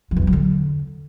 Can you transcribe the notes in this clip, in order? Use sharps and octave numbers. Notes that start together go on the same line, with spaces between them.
F3
E2
F3
F#3
D3